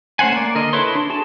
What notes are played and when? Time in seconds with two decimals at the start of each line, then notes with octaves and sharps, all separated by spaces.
0.19 A3 C#4 C5 F#5 G#5
0.33 A#3 D5
0.55 D3 A#4 D#5
0.73 E4 A4 B4 C#5 C6
0.95 D4
1.09 F#4 G#4 A4 A5